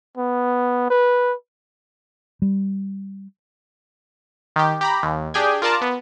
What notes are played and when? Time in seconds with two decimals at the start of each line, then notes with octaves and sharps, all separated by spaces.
0.18 B3
0.90 B4
2.42 G3
4.56 D#3 G4
4.81 G4 A#5 B5
5.03 D#2
5.34 D4 G4 G#4 G5 G#5
5.62 F4 A#4 D5 A5 A#5
5.81 B3